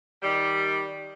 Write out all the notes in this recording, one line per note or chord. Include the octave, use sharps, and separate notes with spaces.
D#3 G3